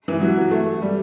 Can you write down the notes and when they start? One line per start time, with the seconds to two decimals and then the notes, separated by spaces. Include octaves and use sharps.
0.08 E3
0.21 F#3
0.51 A3
0.82 G3